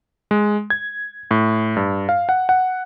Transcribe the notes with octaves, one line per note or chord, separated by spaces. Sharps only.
G#3
G#6
A2
G2
F5
F#5
F#5